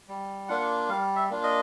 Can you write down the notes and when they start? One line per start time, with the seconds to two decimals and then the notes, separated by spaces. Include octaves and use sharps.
0.08 G3
0.49 A#3 D4 F4 F#5
0.89 G3 F5
1.16 E5
1.30 A#3 D4 F4
1.43 D#5